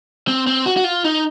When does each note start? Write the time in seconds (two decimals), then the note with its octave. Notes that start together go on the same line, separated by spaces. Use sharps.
0.28 C4
0.47 C4
0.66 F#4
0.77 F#4
0.84 F4
1.04 D#4